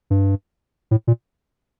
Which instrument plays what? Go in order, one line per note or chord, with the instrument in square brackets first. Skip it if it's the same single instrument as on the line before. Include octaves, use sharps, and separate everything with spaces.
[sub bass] G2
A2
A#2